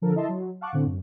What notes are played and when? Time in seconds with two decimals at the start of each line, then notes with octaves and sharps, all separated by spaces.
0.01 D3 F3 A4 A#4
0.15 E4 D#5 E5 A5 C6
0.28 F#3
0.61 F5 F#5 A5 C#6 D6 F#6
0.73 A2 D3 C4
0.85 F#2